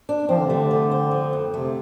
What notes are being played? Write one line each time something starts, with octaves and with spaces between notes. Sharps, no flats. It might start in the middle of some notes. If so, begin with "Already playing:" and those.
D4
F3 C4
D3
C3 A3
D3
F3
C4
F3
F2
C3 A3